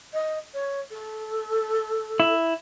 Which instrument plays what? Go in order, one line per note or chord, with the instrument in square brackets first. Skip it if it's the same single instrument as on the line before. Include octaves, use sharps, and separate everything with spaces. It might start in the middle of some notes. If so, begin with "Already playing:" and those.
[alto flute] D#5
C#5
A4
[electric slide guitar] E4